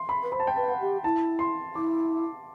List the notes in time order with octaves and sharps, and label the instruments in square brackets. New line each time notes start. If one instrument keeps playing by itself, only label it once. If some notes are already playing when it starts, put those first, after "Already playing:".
Already playing: [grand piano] C6
B5
[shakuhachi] B4
[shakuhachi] C5 [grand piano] B5
[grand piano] A5
G5
[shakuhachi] B4 [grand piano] A5
[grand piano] F#5
[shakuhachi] G4
[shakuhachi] E4 [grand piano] A5
[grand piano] C6
[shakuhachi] E4 [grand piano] D6